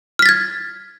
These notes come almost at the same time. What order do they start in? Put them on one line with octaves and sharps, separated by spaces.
F6 B6 A6 G#6